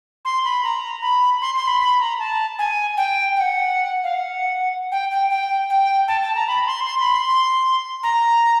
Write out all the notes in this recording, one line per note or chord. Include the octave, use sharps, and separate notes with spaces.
C6
B5
A#5
B5
C6
C6
B5
B5
A#5
A5
G#5
G5
G5
F#5
F5
F#5
G5
G5
G5
G5
A5
A5
A#5
B5
C6
C6
B5
C6
A#5